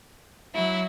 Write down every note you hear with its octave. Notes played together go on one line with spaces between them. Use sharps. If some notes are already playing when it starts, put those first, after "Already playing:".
F#3 E4